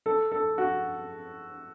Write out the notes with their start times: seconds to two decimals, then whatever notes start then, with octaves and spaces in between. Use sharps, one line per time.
0.06 A4
0.32 A4
0.58 F#4